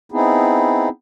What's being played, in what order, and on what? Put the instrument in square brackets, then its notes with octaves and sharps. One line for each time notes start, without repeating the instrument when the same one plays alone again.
[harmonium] B3 C4 D#4 E4 G#4